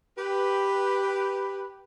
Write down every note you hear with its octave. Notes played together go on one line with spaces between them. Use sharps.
G4 B4